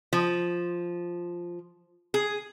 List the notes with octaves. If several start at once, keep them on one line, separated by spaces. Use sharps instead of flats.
F3
G#4